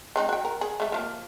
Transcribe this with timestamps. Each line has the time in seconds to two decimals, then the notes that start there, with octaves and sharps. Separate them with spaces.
0.16 G#3 C4 D#4
0.29 F#4 G5
0.45 A#4
0.61 G#4
0.80 G#3 A3
0.92 F3 A3 A#3